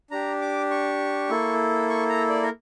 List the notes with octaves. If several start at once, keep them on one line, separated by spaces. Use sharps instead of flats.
D4 G4 A#5
D6
C#6
A#3 E4 A4
C#6
A#5
D5
A#4